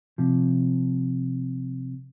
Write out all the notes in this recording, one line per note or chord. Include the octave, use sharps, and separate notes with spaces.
C3 F3